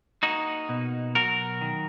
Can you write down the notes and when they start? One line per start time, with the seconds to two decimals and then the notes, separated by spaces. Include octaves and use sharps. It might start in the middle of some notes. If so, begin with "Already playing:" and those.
0.23 A#3 D#4 F#4
0.69 B2
1.15 F#3 F#4 A#4
1.61 D#3